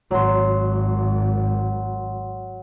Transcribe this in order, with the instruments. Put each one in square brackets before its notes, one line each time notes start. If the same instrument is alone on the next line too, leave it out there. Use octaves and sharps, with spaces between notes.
[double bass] G#1 [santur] F#3 C6